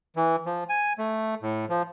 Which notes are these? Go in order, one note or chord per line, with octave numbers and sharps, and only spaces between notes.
E3
F3
G#5
A3
A2
F3